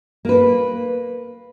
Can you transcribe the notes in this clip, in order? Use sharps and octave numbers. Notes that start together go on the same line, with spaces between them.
A#3 B4